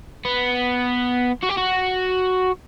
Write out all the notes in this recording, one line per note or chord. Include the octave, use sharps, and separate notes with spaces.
B3
F#4
G4
F#4